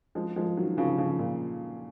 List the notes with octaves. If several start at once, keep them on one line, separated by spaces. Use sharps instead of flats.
F3 G#3
F3 G#3
D#3 F#3
C#3 F3
C#3 F3
A#2